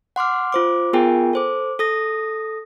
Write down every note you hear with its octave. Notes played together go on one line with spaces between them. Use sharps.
F#5 C6 D6 F6
F4 C5 D6
B3 F4 G#4 A#4 G5 G#5
A4 C5 D6
A4 D#6 A#6